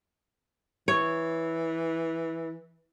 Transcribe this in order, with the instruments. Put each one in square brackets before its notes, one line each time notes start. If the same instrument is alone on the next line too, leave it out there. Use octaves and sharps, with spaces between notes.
[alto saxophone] E3 [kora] C#5